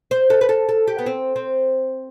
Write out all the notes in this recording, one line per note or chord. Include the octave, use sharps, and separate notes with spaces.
C5
A4
B4
A4
A4
G4
B3
C4
C4